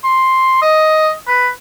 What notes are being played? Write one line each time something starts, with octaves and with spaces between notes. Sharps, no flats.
C6
D#5
B4